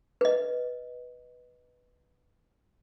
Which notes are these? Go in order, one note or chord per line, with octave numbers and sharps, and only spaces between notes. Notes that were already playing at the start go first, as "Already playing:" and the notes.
B4 D#5